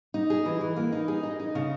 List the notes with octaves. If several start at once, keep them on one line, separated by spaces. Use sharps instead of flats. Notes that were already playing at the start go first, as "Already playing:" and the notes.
D#4
G#4
E3
E3
A#3
D#4
G#4
D#4
D#4
C#3